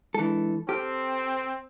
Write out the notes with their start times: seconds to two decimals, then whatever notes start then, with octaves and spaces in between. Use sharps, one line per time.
0.15 E3 G#3 D4 A4
0.69 C4 G4 A4 A5 F6